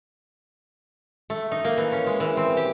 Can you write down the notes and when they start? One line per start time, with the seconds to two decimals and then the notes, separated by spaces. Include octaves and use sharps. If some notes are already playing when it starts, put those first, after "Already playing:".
1.30 A3
1.52 D#4
1.65 A#3
1.78 E3
1.92 C#4
2.07 G#3
2.20 E3
2.37 C4
2.57 G4